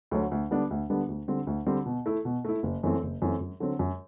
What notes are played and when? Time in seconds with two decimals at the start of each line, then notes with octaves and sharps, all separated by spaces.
0.11 D2 D3 F#3
0.31 D2
0.51 D3 G3 B3 D4
0.71 D2
0.90 D3 G3 B3 D4
1.08 D2
1.28 D3 G3 C4
1.47 D2
1.67 D3 G3 C4
1.86 B2
2.06 A3 E4
2.25 B2
2.45 A3 E4
2.63 F#1
2.83 F#2 E3 A3 C4
3.03 F#1
3.22 F#2 E3 A3 C4
3.41 F#2
3.60 D3 F#3 C4
3.79 F#2